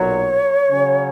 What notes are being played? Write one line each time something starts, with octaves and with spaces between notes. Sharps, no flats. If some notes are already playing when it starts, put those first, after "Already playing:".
Already playing: B1 A#2 F#3 C#5
C#3 F#3 C#4